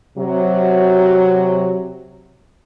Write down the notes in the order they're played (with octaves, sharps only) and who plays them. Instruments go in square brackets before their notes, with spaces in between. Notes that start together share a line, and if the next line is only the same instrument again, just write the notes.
[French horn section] C3 F#3